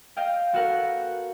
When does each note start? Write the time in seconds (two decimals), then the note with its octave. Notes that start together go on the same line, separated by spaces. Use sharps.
0.16 D#5 F5 G5
0.53 B3 F#4 A4 A#4 F#5